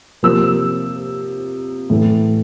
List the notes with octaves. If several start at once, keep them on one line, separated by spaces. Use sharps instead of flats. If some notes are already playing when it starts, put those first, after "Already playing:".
C3 F3 A#3 E6
A2 E3 A3